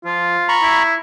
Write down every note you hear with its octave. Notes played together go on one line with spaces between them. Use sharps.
F3 F4
A#5 B5 C#6
E4